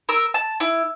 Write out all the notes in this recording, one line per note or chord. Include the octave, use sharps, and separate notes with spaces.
A#4 E6
A5
E4